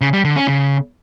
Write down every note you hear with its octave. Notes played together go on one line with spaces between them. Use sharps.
C#3
G3
D3
C#4
C#3